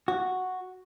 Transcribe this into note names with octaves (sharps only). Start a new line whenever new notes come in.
F#4